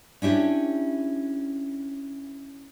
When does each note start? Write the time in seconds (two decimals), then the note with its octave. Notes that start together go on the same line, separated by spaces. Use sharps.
0.22 C#4 D4 E4 G4